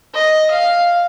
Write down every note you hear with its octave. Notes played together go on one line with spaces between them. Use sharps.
D#5
F5